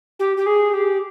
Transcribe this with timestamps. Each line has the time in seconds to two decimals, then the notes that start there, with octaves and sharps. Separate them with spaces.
0.19 G4
0.37 G4
0.46 G#4
0.74 G4